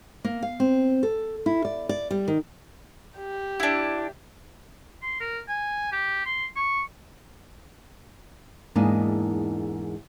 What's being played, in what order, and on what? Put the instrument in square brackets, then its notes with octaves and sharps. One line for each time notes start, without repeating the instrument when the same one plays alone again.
[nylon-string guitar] A#3
F5
C4
A4
E4
D5
D5
G3
D#3
[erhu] G4
[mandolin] D4 E4
[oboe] C6
A#4
G#5
G4
C6
C#6
[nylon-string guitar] E2 G#2 A#3 D4 D#4